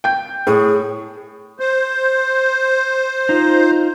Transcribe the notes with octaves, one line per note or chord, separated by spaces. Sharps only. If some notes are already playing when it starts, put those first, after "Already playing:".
G5 G6
A2 G#4
C5
D#4 F4